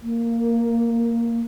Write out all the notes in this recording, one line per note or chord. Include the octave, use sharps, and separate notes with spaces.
A#3